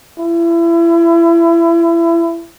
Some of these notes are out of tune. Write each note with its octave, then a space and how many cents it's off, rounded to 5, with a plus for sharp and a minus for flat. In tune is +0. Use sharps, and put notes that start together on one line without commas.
E4 +30